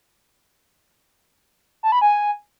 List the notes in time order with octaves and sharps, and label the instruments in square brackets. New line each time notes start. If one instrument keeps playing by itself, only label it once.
[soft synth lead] A5
B5
G#5